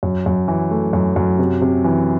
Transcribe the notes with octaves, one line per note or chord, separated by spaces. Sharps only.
F#2
F#2
E3
A3
F#2
F#2
C3
C3
E3